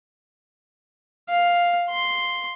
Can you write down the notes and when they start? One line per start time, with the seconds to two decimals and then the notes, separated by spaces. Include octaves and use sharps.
1.29 F5
1.90 C6